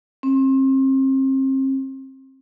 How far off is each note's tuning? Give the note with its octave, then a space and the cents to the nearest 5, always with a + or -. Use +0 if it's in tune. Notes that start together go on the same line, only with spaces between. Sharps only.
C4 +35